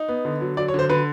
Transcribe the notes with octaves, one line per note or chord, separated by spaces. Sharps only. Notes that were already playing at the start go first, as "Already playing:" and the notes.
Already playing: D#4
B3
D3
F#3
F#3 D5
C#5
D3 C5
D3 B4